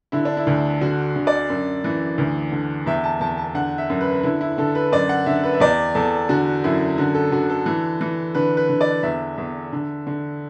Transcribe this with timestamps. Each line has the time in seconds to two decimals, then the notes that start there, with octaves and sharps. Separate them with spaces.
0.12 D3 E4
0.25 D4
0.37 E4
0.47 D2
0.81 D3 F#4
1.16 D3
1.27 D5
1.50 F#2
1.84 E3
2.18 D2
2.52 D3
2.86 E2 E5
3.04 A5
3.21 E2 A5
3.38 A5
3.55 D3 F#5
3.78 E5
3.90 F#2
4.01 B4
4.23 D3 E4
4.41 E4
4.58 D3 A4
4.75 B4
4.92 F#2 D5
5.09 F#5
5.26 D3 E5
5.44 B4
5.53 E5
5.60 E2 D5
5.95 E2 A4
6.29 D3 F#4
6.64 F#2 E4
6.98 D3 F#4
7.14 A4
7.32 D3 F#4
7.50 A4
7.66 E3
8.01 E3
8.35 D3 B4
8.57 B4
8.69 D3
8.81 D5
9.03 E2 E5
9.38 E2
9.72 D3
10.07 D3